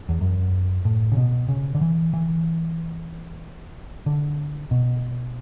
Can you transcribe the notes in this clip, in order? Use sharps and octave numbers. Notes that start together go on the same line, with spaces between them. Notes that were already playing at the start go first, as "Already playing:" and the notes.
E2
F#2
A2
C#3
B2
C#3
D3
E3
E3
D3
B2